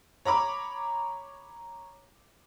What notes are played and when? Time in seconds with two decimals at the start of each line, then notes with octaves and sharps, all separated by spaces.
0.25 C#5 A#5 B5 D6